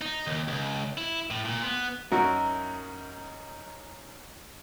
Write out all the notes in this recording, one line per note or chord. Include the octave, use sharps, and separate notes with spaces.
D#4
D#2
C#2
E4
A2
A#2
B3
F#2 C#4 D#4 F#4 A#4 E5